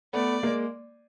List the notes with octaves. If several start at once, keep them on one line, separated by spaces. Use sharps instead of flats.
A3 B3 D5
G#3 A#3